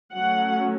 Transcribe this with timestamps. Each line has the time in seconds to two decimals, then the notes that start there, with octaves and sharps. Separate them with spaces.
0.16 F#3 A3 C#4 F#5